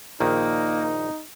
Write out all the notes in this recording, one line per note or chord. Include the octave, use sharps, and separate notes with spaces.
A#1 D#3 A#3 D#4